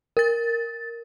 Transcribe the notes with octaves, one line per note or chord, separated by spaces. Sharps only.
A#4 A6